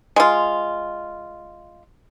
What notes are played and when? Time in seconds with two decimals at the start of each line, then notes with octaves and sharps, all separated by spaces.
0.16 G#3 F4